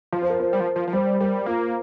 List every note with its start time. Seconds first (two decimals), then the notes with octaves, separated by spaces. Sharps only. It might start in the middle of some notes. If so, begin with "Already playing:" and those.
0.13 F3
0.22 C5
0.30 A#4
0.39 C5
0.53 G3
0.60 F3
0.76 F3
0.88 F3
0.93 G3 C5
1.20 G3 A#4
1.46 A#3 F4